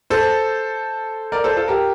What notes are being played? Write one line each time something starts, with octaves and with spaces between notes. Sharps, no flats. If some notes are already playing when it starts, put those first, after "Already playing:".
A4 C5
A#4 D5
A4 C5
F4 A4
G4 A#4